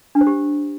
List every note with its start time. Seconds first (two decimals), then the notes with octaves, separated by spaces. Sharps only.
0.15 D4
0.21 C5
0.27 G4